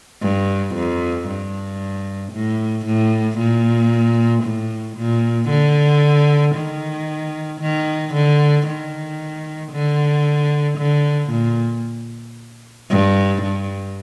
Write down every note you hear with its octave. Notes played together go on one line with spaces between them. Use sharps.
G2
F2
G2
A2
A2
A#2
A2
A#2
D3
D#3
D#3
D3
D#3
D3
D3
A#2
G2
G2